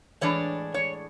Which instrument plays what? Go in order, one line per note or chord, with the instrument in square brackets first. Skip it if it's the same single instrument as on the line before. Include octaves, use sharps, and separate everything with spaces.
[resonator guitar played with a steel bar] A2 E3 G#3 D4 C#5
C#5